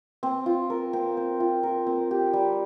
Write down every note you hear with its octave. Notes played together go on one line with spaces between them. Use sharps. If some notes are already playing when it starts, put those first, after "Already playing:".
C4
F4
A#4
C4
C4
F4
A#4
C4
G4
G3